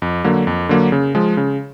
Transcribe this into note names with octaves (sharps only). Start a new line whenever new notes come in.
F2
D3 F#3 A#3
F2
D3 F#3 A#3
C#3
F3 G#3
C#3